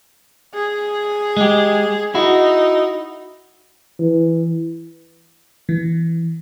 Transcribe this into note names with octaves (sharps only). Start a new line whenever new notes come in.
G#4
G#3 G4
D#4 E4 F#4
E3
E3